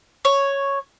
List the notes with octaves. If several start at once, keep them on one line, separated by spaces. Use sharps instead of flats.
C#5